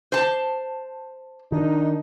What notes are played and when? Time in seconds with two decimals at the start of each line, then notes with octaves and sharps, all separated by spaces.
0.12 C5 A5
1.52 D#3 D4 D#4